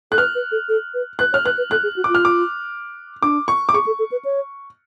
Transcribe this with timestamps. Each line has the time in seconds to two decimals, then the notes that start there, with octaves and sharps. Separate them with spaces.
0.12 A4 F#6
0.18 B4 F6
0.35 B4
0.52 A4
0.69 A4
0.94 B4
1.19 B4 F#6
1.32 C#5 F6
1.45 B4 F#6
1.58 B4
1.71 A4 F#6
1.83 G#4
1.96 F#4
2.04 F4 D6
2.15 F6
2.25 D6
3.22 D4 D6
3.48 C#6
3.69 D6
3.74 G#4 C#6
3.86 A4
3.99 A4
4.12 B4
4.25 C#5